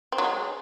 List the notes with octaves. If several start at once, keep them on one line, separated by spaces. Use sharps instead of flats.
C4
F#3
G#3